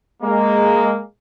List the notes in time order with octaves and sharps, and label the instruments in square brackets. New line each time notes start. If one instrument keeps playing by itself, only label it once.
[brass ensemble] G#3 A#3